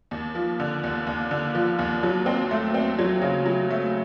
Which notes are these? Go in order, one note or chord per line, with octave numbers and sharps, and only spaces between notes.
D#2
F3
D3
D#2
D#2
D3
F3
D#2
F#3
C4
A3
C4
F#3
C#3
F#3
A3